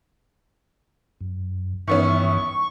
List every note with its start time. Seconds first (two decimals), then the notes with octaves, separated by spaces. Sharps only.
1.21 F#2
1.87 G2 D#3 E3 B3 C#4 E5 C#6